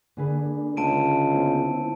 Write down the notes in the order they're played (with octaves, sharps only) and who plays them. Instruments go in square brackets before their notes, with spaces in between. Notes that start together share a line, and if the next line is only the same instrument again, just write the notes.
[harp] D3 G#4 B4 [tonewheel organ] A#3 D4
[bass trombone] C#2 [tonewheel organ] G#3 [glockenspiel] A5 D7 D#7 [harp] C6 G#6
[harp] A#3 C5 [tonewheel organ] B3 E4